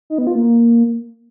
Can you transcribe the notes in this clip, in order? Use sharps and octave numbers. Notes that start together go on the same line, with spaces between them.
D#4
B3
F4
A#3